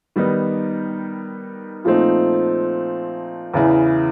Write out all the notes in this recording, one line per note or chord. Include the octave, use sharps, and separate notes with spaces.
D#3 G3 B3 D#4
A#2 F3 A3 C4 D#4
E2 C#3 E3